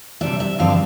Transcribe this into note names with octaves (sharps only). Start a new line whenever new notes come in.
C3 G3 D4 E5
E5
G2 D3 F3 C4 F5